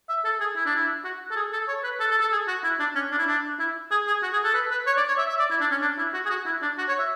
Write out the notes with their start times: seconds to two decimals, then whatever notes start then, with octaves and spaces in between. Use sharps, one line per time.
0.09 E5
0.25 A4
0.40 G#4
0.56 E4
0.66 D4
0.76 E4
1.04 F#4
1.31 A4
1.36 G#4
1.53 A4
1.68 C#5
1.84 B4
2.00 A4
2.11 A4
2.21 A4
2.32 G#4
2.48 F#4
2.64 E4
2.79 D4
2.95 C#4
3.11 D4
3.18 E4
3.27 D4
3.59 E4
3.91 G#4
4.07 G#4
4.23 F#4
4.33 G#4
4.44 A4
4.54 B4
4.71 B4
4.87 C#5
4.97 D5
5.08 C#5
5.18 E5
5.29 E5
5.40 D5
5.51 E4
5.61 D4
5.71 C#4
5.82 D4
5.98 E4
6.14 F#4
6.26 G#4
6.30 F#4
6.46 E4
6.62 D4
6.78 F#4
6.89 C#5
6.99 E5